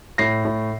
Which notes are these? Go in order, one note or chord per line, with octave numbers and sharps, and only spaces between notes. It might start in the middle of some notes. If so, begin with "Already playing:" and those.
A2 A#6 C7
A2